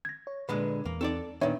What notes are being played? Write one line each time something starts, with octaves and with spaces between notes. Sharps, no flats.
G#6 A#6
C#5
A#2 D3 G#3 B4
E2 A#3
C4 D#4 A4 C#5 D5
A#2 D#3 B3 D4 B4 C#5 E5